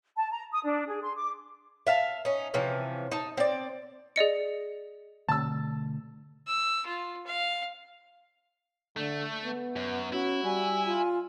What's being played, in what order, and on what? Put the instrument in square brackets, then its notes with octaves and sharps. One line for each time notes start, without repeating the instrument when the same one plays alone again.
[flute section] A5
A#5
D#6
D4
G#4
C6
D6
[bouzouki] E5 F5 A5
C#4 D#4
C3 E3 F3 C#4
D#4 A5
C4 D5
[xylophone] G#4 D5 D#5 C#7
[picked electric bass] B2 D3 A3 [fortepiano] A5 E6
[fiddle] E6
F4
F5
[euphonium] D3 [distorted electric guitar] A3
[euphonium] B3
[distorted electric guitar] F#2
[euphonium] C#4 [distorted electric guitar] E4 [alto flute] F#4
[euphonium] G3 [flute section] G#5
[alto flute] F4